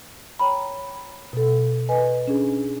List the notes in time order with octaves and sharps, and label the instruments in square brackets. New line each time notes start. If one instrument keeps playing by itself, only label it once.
[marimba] C#5 G5 A#5 B5
B2 A4
B4 D#5 G#5
C#4 D4 G#4